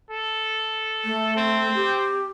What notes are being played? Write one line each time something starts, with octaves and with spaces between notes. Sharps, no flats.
A4
A3
C4
G4